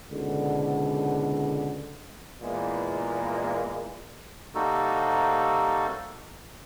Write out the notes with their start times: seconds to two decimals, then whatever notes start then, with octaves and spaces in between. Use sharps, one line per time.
0.11 C#2 G#2 B2 D3
2.42 E2 A#2 E3 G#3 A#3
4.55 C3 G3 A#3 D#4 F#4 A4